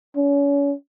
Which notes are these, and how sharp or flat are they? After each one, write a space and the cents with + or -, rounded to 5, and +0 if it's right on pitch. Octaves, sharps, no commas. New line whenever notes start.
C#4 +35